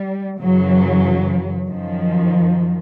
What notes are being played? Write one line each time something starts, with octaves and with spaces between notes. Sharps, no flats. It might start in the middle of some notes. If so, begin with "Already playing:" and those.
Already playing: G3
F#2 C#3 E3 F#3
F#2 D#3 F3